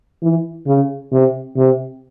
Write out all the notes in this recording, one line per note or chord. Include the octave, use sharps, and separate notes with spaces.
E3
C#3
C3
C3